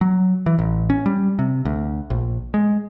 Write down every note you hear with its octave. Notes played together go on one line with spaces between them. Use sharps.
F#3
E3
A1
C#4
G3
C3
D2
A#1
G#3